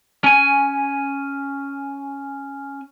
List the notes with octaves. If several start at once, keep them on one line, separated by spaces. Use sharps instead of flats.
C#4 G#5